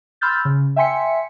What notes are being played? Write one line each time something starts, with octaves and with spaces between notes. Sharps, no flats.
B5 C6 E6 F6 G6 A6
C#3
E5 G5 G#5 C6 B6 C#7